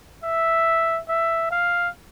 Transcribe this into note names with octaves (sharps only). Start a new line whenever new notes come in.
E5
E5
F5